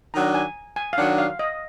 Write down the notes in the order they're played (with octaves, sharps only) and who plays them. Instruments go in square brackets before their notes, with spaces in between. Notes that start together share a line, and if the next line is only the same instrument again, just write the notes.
[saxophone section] D#3 F#3 D4 [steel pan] A#5
[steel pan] G#5
G#5
F5
[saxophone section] D#3 F#3 D4 [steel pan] F#5
[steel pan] F5
D#5